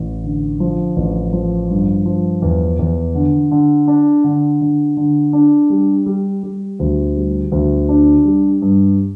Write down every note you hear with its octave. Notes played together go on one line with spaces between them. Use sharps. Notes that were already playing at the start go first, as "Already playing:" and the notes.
Already playing: A1
D3
F3
A1
F3
G2
F3
E2
E2
D3
D3
D4
D3
D3
D3
D4
G3
G3
G3
D2
G3
D2
D4
G3
G2